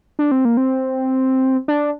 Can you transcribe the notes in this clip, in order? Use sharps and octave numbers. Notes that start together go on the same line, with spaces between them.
D4
C4
A#3
C4
D4